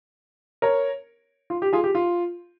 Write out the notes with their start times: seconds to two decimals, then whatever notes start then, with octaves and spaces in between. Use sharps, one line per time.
0.62 A#4 C#5
1.50 F4
1.62 G4
1.73 F4 G#4
1.84 G4
1.95 F4